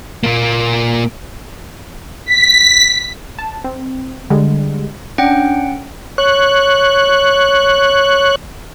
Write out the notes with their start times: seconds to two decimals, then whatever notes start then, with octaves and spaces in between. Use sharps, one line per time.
0.23 A#2 A#3
2.26 B6
3.38 A5
3.64 C4
4.30 D3 G3 G#3
5.18 C#4 D4 F#5 G5
6.18 C#5 F#6